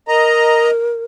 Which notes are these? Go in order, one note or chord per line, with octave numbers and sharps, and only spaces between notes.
A#4 D#5 A#5